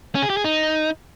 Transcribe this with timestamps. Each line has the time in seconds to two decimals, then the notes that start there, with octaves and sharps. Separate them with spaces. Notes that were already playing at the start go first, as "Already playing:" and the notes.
0.15 C#4
0.22 G#4
0.30 G4
0.37 G#4
0.44 D#4